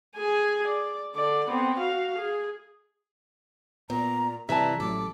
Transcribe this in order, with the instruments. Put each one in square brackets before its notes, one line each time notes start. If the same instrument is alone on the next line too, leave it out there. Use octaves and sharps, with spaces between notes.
[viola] G#4 G#5
D5
D3 D5
B3 C4
F#4 F5
G#4
[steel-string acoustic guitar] A#2 [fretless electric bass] B3 [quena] A#5
[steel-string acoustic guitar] G2 E3 D4 [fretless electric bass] C3 [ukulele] E5 A5 [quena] A#5
[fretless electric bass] A1 F#3 [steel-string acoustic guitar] A4 [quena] D6